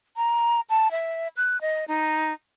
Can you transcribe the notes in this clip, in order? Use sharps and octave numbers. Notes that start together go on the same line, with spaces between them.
A#5
A5
E5
F#6
D#5
D#4